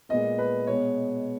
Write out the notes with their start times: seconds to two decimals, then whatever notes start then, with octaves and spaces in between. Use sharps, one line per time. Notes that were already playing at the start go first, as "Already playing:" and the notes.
0.09 A#2 G#3 B3 D#5
0.39 B4
0.67 B2 G#3 B3 C#5